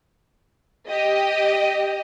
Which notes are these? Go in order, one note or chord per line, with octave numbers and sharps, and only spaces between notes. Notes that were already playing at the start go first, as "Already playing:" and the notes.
G4 D#5